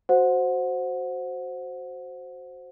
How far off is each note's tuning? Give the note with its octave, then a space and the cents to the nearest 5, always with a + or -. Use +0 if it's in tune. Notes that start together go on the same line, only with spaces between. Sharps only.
F#4 +0 C5 +0 F#5 -20